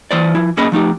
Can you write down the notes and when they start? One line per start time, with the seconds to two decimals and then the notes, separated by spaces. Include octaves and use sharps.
0.11 E3 C5 D5
0.35 F3 E4
0.57 B1 A#3 C#4 G#4 D#5 B5
0.72 F3 A3 D#4 G4